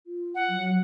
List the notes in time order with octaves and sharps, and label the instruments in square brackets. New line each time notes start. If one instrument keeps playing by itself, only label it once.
[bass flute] F4
[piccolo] F#5
[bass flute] F#3